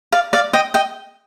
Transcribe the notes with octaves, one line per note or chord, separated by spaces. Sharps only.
D5 F5
D5 F5
D#5 G5
D#5 G5